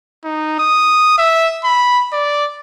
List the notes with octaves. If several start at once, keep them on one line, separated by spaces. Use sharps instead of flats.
D#4
D#6
E5
B5
D5